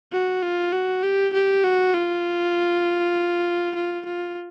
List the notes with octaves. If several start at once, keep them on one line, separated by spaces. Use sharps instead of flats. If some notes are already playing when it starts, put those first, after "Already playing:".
F#4
F4
F#4
G4
G4
F#4
F4
F4
F4